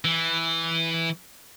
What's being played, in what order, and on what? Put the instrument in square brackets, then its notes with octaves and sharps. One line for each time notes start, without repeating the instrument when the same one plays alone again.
[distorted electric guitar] E3